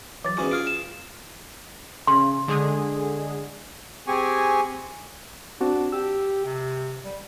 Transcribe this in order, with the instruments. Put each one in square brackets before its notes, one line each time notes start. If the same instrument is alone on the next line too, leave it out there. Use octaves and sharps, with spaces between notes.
[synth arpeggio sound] E3 F#3 [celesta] D6 A6
[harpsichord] E2 G#2 B3 [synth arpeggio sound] C#4 F#4 F#5
[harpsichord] F4 G#4 [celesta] F6 D7
[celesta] E7
[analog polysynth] C#3 [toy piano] C6
[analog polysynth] D3 G#3 G#4
[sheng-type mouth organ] C4 G4 G#4 G#5 C#6
[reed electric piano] C4 F#4 A5 [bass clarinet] D4
[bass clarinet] G4 [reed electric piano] E6
[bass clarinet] C3
G3